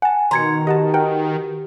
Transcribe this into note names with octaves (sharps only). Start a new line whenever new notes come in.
F#5 G#5 A5
B2 D#3 A#5 C6 G#6 C#7
G4 D#5 F#5 A5
A#4 F#5 G5